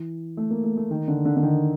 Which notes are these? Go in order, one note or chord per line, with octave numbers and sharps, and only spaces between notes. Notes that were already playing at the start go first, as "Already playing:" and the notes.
Already playing: E3
A3
A#3
A3
A3
D#3
D3
D3
D3
D#3